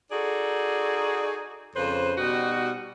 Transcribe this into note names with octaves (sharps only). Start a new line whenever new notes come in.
D#4 F#4 G#4 A4 D5
F2 C#3 B4 C5
B2 G3 D#4 F#4